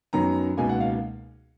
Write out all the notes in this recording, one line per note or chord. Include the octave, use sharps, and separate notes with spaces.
F#2 D#3 F#3 B3 A#5
C#2 B2 A#3 D#4 G#5
F#5
F5